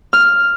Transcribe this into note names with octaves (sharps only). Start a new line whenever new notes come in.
F6